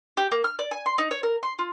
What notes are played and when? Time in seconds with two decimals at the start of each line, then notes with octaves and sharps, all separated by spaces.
0.17 G4
0.31 A#3
0.44 F6
0.59 D5
0.71 G#5
0.86 C6
0.98 D#4
1.11 C#5
1.23 A#4
1.43 C6
1.59 F4